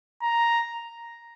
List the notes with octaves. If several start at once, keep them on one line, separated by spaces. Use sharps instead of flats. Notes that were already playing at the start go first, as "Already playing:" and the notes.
A#5